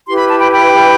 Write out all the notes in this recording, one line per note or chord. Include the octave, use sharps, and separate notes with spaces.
E4 G4 B4 C6
B5
A5
G5 B5
G5 B5